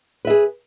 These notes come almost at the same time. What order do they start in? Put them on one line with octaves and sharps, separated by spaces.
B4 E5 G#4